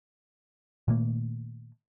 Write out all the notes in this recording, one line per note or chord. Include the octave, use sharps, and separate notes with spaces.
A#2 D#3 A3 A#3